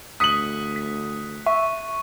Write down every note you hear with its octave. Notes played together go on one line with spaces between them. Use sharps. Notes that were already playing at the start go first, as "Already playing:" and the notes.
D2 D#6 F#6 B6 C#7 F#7
B6
E5 C#6